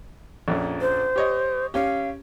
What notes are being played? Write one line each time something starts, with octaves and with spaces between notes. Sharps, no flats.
A#1 F2 C#4
C5
G4 C#5 D#5
C#4 G4 F5